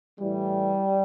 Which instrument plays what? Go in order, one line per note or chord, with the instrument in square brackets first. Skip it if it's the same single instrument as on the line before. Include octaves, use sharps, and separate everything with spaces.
[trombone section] A2 E3 G3